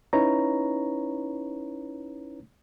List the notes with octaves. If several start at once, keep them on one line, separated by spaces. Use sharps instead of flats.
C#4 D#4 E4 B4 C#5 A#5